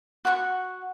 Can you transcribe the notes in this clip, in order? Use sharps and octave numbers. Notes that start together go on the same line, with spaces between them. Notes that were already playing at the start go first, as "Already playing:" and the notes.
F#4 F#5 A5 C#6